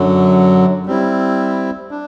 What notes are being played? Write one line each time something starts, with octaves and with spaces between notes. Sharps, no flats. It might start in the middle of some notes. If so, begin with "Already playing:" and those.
Already playing: F#2 D3 F#3
G3 C4 E4
D4